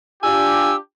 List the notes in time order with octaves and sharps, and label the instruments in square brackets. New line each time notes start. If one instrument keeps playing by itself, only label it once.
[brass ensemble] D4 F4 G4 [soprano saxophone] G#5 [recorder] E6